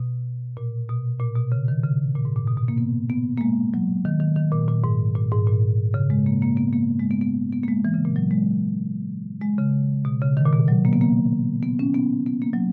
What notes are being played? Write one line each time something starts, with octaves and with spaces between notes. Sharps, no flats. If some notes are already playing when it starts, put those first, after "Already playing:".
Already playing: B2
A#2
B2
A#2
B2
C#3
D#3
C#3
A#2
G#2
A#2
B2
B2
A#3
B3
B3
A#3
G#3
F#3
D#3
D#3
D#3
A#2
A#2
G#2
A#2
G#2
A#2
C#3
G#3
A#3
A#3
B3
A#3
G#3
B3
B3
B3
A#3
G#3
E3
C#3
A#2
F#3
G#3
G#3
C#3
B2
C#3
D#3
A#2
B2
F#3
A#3
B3
A#3
B3
C#4
B3
B3
A#3
F#3